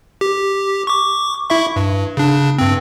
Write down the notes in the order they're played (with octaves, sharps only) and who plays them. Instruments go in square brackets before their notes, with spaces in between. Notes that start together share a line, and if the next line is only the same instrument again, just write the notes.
[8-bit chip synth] G4
C#6 D6
E4 E5 C#6
G2
C#3 D4
G2 C4